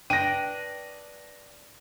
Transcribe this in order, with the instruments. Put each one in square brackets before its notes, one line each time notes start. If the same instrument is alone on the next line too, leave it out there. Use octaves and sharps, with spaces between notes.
[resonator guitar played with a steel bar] D4 B4 G5 [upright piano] A#6 D#7